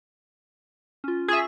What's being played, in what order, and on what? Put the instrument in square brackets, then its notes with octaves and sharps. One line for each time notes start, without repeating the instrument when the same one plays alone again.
[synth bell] C#4 F4
[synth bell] F4 C#6 [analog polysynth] G#4 E5